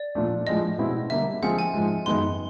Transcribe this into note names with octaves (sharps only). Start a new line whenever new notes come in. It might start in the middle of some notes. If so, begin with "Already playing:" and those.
Already playing: D5
A#2 F3 A3 D4
A2 F3 G#3 D#5
B2 G#3 C4 E4
D3 G3 A#3 E5
F3 G#3 C4 F4 G#4 F#5
G#5
G#2 F3 G#3
F#2 D#3 G#3 B3 D#4 C6